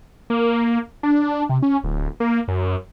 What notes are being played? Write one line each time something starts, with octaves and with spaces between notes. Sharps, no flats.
A#3
D4
C3
C#4
D1
A#3
F#2